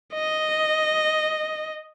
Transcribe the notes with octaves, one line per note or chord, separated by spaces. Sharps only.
D#5